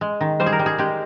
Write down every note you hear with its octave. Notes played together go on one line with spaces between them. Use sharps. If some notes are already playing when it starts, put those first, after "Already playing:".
G#3
D#3
G3 C5
G#4
A#4
G3
G#4
G#3 G4